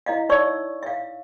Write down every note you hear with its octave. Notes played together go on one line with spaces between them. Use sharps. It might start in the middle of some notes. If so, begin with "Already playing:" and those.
E4 D#5 F5
D#4 C#5 D5 C#6 E6
E5 F5